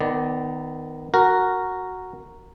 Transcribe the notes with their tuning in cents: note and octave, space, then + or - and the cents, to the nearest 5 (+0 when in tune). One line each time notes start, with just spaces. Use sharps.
D#3 +0 B3 +25 D5 +0
F#4 +0 A#4 -5